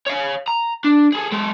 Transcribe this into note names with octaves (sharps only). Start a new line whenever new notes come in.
C#5 F5
A#5
D4
G#4 A4
G#3 A4